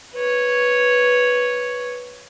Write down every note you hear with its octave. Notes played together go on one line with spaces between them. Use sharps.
B4 C#5